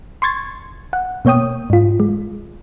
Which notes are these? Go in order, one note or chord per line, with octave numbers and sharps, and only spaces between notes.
C6 C#6 G#6 A6
F#5
B2 A#3 C#5 G5 D#6
G#2 F4
G#3